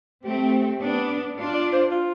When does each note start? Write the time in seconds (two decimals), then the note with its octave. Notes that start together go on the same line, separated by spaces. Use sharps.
0.24 A3 C4 G4
0.80 B3 D4
1.35 D4 F4
1.54 D5
1.73 C5
1.91 F4